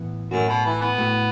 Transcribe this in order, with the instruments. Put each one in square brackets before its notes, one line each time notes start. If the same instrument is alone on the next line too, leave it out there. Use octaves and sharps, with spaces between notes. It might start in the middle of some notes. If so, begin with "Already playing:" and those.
Already playing: [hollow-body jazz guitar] A2 E3 B3
[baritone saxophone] F#2 [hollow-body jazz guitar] A2 A3 F#4
[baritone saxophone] B2
E3
B3
[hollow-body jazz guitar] A2 A3 F#4